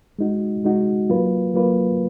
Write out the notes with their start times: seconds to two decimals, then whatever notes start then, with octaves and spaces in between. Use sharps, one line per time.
0.19 G#3 D#4 F#4
0.64 G#3 D#4 F#4
1.10 F#3 A#3 F4 B4
1.54 F#3 A#3 F4 B4